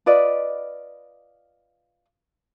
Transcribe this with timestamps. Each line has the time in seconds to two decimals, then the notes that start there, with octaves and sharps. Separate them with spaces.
0.06 F4 B4 D5 D#5